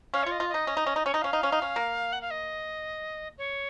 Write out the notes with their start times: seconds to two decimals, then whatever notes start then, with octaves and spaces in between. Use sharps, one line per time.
0.14 C#4 F5
0.23 C#5
0.26 F4
0.32 D#5
0.40 F4
0.49 D#5
0.54 D#4
0.67 C#4
0.77 D#4
0.86 C#4
0.96 D#4
1.06 C#4 C#5
1.14 D#4 D#5
1.22 C#4 F5
1.33 D#4
1.43 C#4
1.52 D#4
1.62 C#4
1.76 A#3
2.13 F#5
2.21 F5
2.31 D#5
3.38 C#5